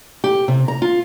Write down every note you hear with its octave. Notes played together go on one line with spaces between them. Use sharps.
G4
C3
A#5
F4